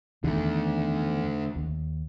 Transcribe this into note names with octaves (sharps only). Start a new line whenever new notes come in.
E2 D3 D#3 A3
D#2